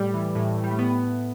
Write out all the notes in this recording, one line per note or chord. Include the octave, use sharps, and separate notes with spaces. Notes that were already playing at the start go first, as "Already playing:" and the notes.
Already playing: A2 G3
E3
A2
A2
G3
A3
A2 B3